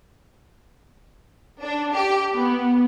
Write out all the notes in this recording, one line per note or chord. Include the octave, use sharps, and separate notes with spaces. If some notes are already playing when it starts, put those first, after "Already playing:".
D4
G4
B3